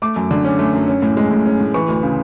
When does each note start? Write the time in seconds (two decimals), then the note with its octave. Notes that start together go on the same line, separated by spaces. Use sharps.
0.02 A3 D6
0.16 F#2
0.31 D3
0.45 C#4
0.59 A3
0.74 F#2
0.88 C#4
1.02 A2
1.17 G#3
1.31 A2
1.46 C#4
1.60 A2
1.74 E3 C#6
1.89 D2
2.03 C#3